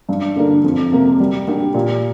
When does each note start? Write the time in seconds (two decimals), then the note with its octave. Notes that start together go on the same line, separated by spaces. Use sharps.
0.09 G2
0.36 D3 A#3 D4
0.64 F2
0.92 C3 A#3
1.20 G3
1.48 A#3 D4 G4
1.74 A#2